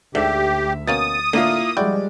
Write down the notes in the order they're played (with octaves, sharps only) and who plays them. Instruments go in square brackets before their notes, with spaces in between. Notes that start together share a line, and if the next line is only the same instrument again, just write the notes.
[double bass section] D2 [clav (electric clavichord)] G#2 D3 [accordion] G4 [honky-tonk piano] E5
[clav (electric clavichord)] B2 A#3 C#4 [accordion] D#6 [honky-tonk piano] A6
[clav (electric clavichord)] A2 D3 [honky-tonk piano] A#3 E4 F4
[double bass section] F3 G3 G#3 [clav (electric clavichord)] E4 F#4 G5 [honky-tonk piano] D5